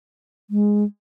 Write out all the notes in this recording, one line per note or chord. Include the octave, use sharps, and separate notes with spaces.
G#3